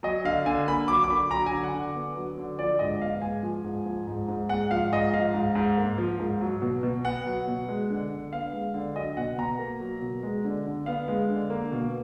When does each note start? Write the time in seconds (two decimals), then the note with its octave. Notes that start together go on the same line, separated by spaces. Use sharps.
0.03 F#3 D#5
0.25 D3 F5
0.46 D3 G#5
0.68 A#3 B5
0.88 F#3 D6
1.04 D6
1.10 D3 B5
1.31 F#3 A#5
1.46 G#5
1.53 D3
1.63 F#5
1.74 D3
1.95 B3
2.16 F#3
2.38 D3
2.59 F3 D5
2.79 G#2 D#5
3.01 B3 F5
3.22 G#3 G#5
3.43 F3
3.64 G#2
3.86 F3
4.07 G#2
4.28 G#2
4.49 G#3 F#5
4.71 F3 F5
4.92 G#2 D#5
5.14 F3 F5
5.34 G#2
5.55 G#2
5.78 A#3
5.98 F3
6.19 G#2
6.41 F#3
6.62 B2
6.83 B2
7.05 B3 F#5
7.26 F#3
7.48 B2
7.68 G#3
7.90 D3
8.11 D3
8.32 B3 F5
8.53 G#3
8.74 D3
8.95 F#3 D#5
9.17 B2 F#5
9.38 B2 A#5
9.59 A#3
9.80 F#3
10.02 B2
10.23 G#3
10.45 D3
10.66 D3
10.86 B3 F5
11.08 G#3
11.30 D3
11.50 A#3
11.72 B2